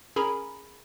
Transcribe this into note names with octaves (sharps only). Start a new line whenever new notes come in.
C#4 G#4 A#4 G#5 A#5 B5